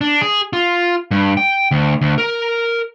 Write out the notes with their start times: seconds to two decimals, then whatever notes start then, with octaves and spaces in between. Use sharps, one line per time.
0.01 D4
0.21 G#4
0.53 F4
1.11 G2
1.37 G5
1.71 D2
2.01 D2
2.18 A#4